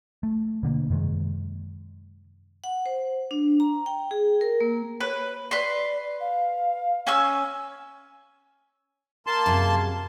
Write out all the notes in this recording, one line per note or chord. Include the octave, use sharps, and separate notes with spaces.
A3
B2 D3 A#3
F#2 C3 D#3 G#3
F#5
C5
D4
A#5
G5
G#4
A#4
A#3
B4 C#5
B4 D5 C6
F5
C#4 G#5 E6
A#3 A5 C6
F#2 C3 G#4